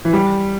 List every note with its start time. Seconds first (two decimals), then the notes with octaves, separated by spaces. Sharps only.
0.05 E3
0.13 G3